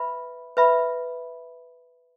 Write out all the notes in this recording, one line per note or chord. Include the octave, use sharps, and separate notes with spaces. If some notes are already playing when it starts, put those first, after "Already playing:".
Already playing: B4 E5 B5
B4 E5 B5